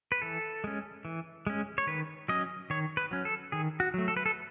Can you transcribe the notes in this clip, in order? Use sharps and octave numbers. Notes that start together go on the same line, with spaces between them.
B4
E3 A4
G#3 C#4
E3
G#3 C#4
C#5
D#3 B4
F#3 C#4 D#5
D#3 C#5
B4
F#3 C#4
A4
D#3 G#4
F#4
F#3 A3
A4
B4
A4